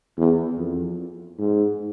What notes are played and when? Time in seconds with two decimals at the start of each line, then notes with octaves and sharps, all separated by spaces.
0.17 E2
0.57 F2
1.38 G#2